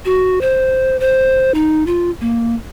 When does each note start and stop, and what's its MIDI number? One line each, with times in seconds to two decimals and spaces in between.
0.05 0.41 66
0.41 0.96 72
1.00 1.54 72
1.54 1.84 63
1.87 2.11 65
2.21 2.54 58